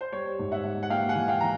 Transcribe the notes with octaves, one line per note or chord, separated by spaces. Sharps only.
C5
G3 C#5
G#2
E5 F#5
G#2
F#5
A#3 F5 G5
F#5 G#5
E3
F5 G5
E3 A#5